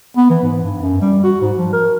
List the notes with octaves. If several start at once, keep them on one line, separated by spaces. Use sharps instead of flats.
B3
E3
G#2
G2
F#2
G3
F#4
G#2
F3
A#4